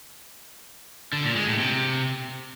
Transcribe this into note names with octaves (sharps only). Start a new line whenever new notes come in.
D3
A#2
G#3
A2
C3